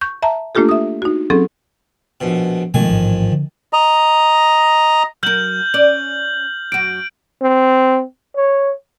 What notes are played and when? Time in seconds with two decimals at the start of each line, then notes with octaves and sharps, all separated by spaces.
0.01 C#6 G6
0.22 E5 A5 A#5
0.55 A3 A#3 D4 F4 G4 A4
0.69 E5 D#6
1.02 D#4 F#4
1.30 F#3 C4 C#4 G#4 A4
2.21 A#1 B2
2.74 F2 B2 D#3 G#3 A3 G#5
2.89 A1 G#2
3.32 D3
3.73 D#5 A#5
5.23 F#3 A#4 F6 G6 F#7
5.74 C#4 D5 F#7
6.72 F#2 F#4 D7
7.42 C4
8.36 C#5